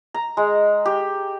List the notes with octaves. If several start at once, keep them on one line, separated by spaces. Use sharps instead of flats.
A#5
G#3
G4